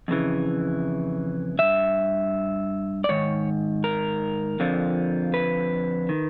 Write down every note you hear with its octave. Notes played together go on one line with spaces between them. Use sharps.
F2 C#3 E3
G2 E3 E5
D5
G#2 D#3 C#5
A#4
F2 D3 F3
B4
D#3